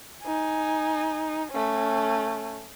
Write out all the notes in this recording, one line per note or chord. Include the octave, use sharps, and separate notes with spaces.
D#4 G#5
A3 C#4